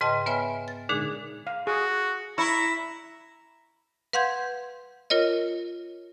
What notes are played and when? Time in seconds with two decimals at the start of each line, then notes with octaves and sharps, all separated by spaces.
0.01 G#2 C#3 B4 D#5 G5 A5
0.26 B3 B4 C#5 E5 G#5 F6
0.68 A6
0.89 A#2 D3 G#3 D4 D#4 G#4
1.47 F5
1.67 F#4 G#4
2.38 E4 A#5 C#6
4.13 B4 F5 F#5 C6 G6 G#6
5.10 F4 A#4 C#5 D#5